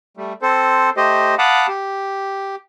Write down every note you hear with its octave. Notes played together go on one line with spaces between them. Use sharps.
G3 A3
C4 A4 C5
A3 G4 C5 D#5
F5 F#5 A5 B5 D6 D#6
G4